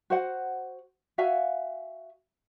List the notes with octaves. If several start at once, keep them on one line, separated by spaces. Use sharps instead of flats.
F#4 C5 F#5
F#4 E5 F5 G#5